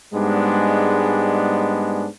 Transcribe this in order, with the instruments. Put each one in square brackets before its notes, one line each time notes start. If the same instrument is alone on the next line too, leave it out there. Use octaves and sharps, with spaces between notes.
[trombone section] G#2 G3 G#3 B3 D4